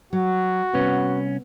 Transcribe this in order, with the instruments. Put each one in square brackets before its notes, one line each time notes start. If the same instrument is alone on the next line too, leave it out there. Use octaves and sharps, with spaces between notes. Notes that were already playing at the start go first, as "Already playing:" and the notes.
[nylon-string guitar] F#3 [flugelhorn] F#4
[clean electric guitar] C2 C#4 [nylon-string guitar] B3